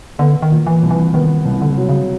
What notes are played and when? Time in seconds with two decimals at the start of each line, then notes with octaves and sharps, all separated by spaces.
0.19 D3 B3
0.42 D#3
0.51 A#2
0.67 E3
0.83 C2
0.91 E3
1.14 D#3 B3
1.45 C2
1.62 D3
1.70 C#3
1.77 C3 F#3
1.89 C#3